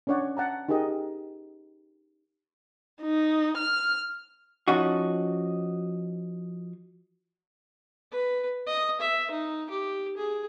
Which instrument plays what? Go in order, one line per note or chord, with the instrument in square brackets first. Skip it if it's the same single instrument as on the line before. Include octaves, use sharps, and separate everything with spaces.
[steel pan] C#4 D4 C#5 D5 F#5
F#5 A5 A#5
D#4 G4 G#4 A#4 D#5
[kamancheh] D#4
F6
[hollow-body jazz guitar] F3 C#4 D#4 F#4
[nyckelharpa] B4
D#5
E5
D#4
G4
G#4